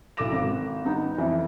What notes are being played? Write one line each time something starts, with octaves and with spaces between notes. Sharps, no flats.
B1 E4 A4 D6 A#6 E7
G#1
G3 B3 D#4
F2 E3